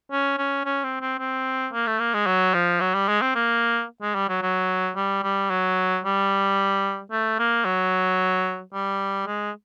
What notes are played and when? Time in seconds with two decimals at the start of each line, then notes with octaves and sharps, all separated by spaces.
0.12 C#4
0.38 C#4
0.65 C#4
0.84 C4
1.01 C4
1.19 C4
1.73 A#3
1.87 A3
2.00 A#3
2.14 G#3
2.27 F#3
2.54 F3
2.81 F#3
2.94 G3
3.08 G#3
3.22 C4
3.35 A#3
4.02 G#3
4.15 G3
4.29 F#3
4.42 F#3
4.96 G3
5.23 G3
5.50 F#3
6.04 G3
7.12 A3
7.39 A#3
7.65 F#3
8.74 G3
9.27 G#3